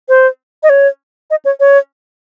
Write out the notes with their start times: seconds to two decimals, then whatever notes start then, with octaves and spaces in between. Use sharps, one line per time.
0.09 C5
0.63 D#5
0.69 C#5
1.31 D#5
1.45 C#5
1.60 C#5